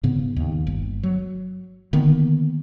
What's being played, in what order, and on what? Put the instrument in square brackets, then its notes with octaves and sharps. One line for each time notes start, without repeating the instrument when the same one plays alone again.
[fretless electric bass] G#2 C#3 B3
D#2
G1
F#3
D3 D#3 A#3 B3